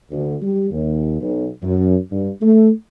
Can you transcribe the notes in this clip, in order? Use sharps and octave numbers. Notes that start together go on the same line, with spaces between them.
D2
G3
D#2
B1
F#2
G2
A3